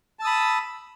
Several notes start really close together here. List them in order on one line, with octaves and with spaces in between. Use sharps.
A5 E6 D#6 B5